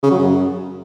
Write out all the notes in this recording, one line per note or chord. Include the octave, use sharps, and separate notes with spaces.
C#3
F#3
F#2